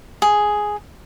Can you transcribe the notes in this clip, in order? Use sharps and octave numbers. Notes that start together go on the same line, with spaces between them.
G#4